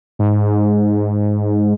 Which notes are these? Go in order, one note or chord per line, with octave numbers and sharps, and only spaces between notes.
G#2